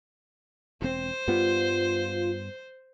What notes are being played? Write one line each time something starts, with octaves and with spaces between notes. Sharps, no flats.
E1 C4 C5
G2 G3 B3 F4